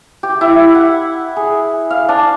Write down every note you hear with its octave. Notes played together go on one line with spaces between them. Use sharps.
G4
E4
F#5
G#4
F5
D4